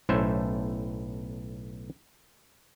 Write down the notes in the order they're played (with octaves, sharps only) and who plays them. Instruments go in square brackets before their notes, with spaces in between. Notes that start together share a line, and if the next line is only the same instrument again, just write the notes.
[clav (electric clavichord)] B1 A2 A3 C#4 C5 E5